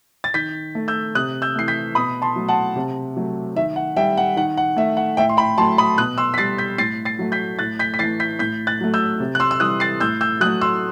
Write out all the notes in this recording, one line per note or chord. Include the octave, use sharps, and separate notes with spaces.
A6
D#3 G6 B6
A3
E6 G6
C3 D#6 F#6
E6 G6
E3 A3 C7
G6 B6
B2 B5 D#6
A5 C6
F#3 A3
F#5 A5
C3
F#3 A3
D#3 E5
F#5
G3 E5 G5
F#5
D#3 F#5
F#5
A3 E5
F#5
A2 E5 G5
C6
G5 B5
F#3 A3 A5 C6
B5 D#6
B2 D#6 F#6
C6 E6
B6
G3 A6 C7
G6 B6
A2 A6 C7
A6 C7
F#3 A3
G6 B6
A2 F#6 A6
G6 B6
B6
E3 A3 A6 C7
G6 B6
A2 G6 B6
F#6 A6
F#3 A3
E6 G6
C3
F#6
C6 E6
E6
E3 G3 D#6 F#6
A6 C7
A2 E6 G6
E6 G6
F#3 A3 D#6 F#6
C6 E6